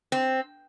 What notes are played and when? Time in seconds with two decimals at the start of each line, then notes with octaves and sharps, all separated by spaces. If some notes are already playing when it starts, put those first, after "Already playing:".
0.12 C4